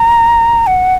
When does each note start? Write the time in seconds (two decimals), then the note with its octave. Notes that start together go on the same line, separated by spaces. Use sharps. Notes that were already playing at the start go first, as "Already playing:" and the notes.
Already playing: A#5
0.67 F#5